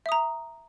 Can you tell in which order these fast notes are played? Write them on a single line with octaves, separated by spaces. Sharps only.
E5 D#6 A#5